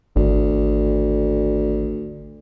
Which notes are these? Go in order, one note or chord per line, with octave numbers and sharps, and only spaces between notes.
G#1 D2